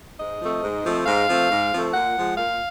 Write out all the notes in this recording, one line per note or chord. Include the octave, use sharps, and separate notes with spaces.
G#2 D#5
F3 A3 C4
G#2
F3 A3 C4
G#2 F5
F3 A3 C4
G#2
F3 A3 C4
A#2 F#5
F3 G#3
A#2 F5